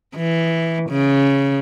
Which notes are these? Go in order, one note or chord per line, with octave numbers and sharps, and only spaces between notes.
E3
C#3